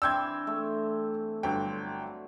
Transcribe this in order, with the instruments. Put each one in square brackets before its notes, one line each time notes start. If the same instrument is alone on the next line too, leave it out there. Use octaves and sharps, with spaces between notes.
[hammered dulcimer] E3 C4 D4 [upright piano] E6 G6 G#6
[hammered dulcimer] A3
[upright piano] G1 G5 [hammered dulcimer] F#3